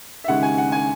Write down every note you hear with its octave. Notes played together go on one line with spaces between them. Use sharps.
E5
D#2 C#3 G#3 F#5
G#5
F#5
G#5